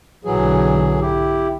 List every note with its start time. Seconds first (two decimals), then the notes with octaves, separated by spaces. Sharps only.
0.25 B1 G#2 D3 E3 F#3 G#4
1.01 E4 G4